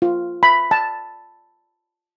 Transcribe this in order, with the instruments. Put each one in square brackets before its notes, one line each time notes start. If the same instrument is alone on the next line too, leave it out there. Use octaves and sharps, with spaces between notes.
[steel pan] F4
B5
A5